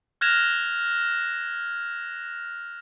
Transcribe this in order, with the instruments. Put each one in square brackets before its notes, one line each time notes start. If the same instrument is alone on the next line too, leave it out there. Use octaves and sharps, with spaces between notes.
[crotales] F6 F#6 G#6 A#6 E7 F7